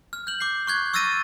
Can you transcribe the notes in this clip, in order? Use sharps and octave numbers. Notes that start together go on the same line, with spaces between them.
F6
G6 F#7
D6 G6 C7
C#6 F#6 G#6
C#6 E6 F6 A6 A#6 D#7